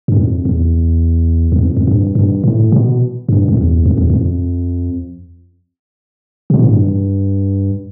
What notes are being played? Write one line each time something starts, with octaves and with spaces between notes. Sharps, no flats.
G2
F2
E2
E2
F2
F2
G2
G2
A2
B2
G2
F2
E2
F2
E2
F2
B2
A2
G2